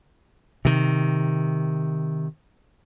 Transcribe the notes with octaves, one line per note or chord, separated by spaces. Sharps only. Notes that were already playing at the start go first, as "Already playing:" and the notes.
C3 D#3